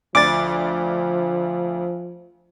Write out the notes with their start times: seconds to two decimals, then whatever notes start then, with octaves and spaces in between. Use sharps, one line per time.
0.15 D2 F3 D5 D6 A6